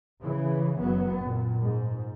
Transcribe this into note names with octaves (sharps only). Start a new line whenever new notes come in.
C#3 E3
F#1 F#3 B3
A#2
G#2